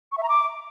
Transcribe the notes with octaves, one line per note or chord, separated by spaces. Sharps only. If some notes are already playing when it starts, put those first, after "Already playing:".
C#6
E5
A#5
D6